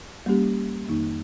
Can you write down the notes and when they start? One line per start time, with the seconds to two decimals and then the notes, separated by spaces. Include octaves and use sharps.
0.26 G3 A#3 C#4 G4
0.88 F2 D#3 A#3 D#4